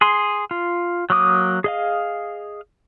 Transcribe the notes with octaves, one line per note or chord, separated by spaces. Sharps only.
G#4 C6
F4
F#3 A#3 D6 D#6
G#4 D#5 F5